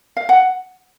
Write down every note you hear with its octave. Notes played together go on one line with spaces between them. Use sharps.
F5
F#5